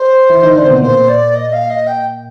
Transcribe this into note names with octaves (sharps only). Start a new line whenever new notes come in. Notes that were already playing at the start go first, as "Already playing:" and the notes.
Already playing: C5
E3 E4
D#3 D#4
D3 D4
C4
B2 B3
A#2 A#3 C5
D5
D#5
F5
D#5
G5